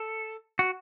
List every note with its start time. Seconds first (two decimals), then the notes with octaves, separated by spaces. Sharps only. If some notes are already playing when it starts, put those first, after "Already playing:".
Already playing: A4
0.59 F#4